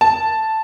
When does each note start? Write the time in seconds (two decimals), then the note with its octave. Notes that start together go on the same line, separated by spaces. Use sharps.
0.01 A5